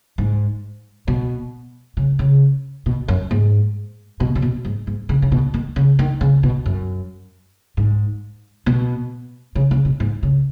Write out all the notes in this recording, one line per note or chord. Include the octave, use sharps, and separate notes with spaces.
G#2
B2
C#3
C#3
B2
F#2
G#2
B2
C#3
B2
G#2
G#2
C#3
C#3
B2
D#3
C#3
D#3
C#3
B2
F#2
G#2
B2
C#3
C#3
B2
G#2
C#3